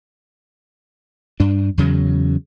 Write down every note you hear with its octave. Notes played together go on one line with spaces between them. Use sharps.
G2 D4
E2 C#3 F#3